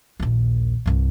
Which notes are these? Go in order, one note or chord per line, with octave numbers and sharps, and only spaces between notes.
A#1 D#2
C2 G2